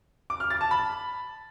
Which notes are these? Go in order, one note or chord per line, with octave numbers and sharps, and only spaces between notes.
D6
F6
A6
A5
B5